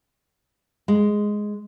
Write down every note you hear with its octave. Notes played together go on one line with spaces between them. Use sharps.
G#3